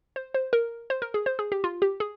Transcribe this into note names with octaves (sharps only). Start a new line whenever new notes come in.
C5
C5
A#4
C5
A#4
G#4
C5
G#4
G4
F4
G4
G#4